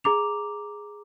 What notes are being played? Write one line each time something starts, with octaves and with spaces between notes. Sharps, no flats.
G#4 A#5 D6 F7